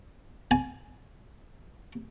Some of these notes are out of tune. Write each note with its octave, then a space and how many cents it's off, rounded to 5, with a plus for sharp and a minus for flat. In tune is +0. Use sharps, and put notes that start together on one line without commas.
G#5 +15